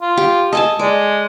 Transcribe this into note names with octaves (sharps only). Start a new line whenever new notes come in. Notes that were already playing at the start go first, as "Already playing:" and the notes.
F4
G4
A4 D#5 G#5 A5
G#3 D5